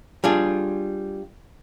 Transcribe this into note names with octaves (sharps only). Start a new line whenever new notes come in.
G3 D4 F4 G#4